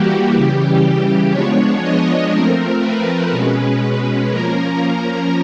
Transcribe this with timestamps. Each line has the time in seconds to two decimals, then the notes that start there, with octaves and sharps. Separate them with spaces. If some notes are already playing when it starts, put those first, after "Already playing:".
Already playing: E3 G3 A#3 F#4 G4
0.33 C#3 E3 G3
1.31 F3 G#3 B3 D4 C#5
1.82 D#5
2.31 F3 A3 C4 A#4
2.81 B4
3.31 B2 G#3 C#4
4.30 F3 A#3 C#4 A#4